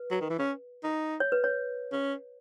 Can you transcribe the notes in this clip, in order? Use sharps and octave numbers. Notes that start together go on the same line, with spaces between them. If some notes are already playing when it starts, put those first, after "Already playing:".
Already playing: B4
F#3
D#3
E3
C#4
D#4
C#5
B4
C#5
C#4